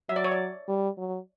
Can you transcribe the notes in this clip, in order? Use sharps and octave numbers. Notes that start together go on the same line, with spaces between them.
F#3 E5
D5
C#5
D5
G3
F#3